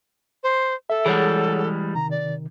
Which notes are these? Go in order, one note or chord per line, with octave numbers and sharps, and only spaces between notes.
C5
A4 E5
E3 G3 G#3 G#4 C#5 F#5
C3 D#3 A#5
D5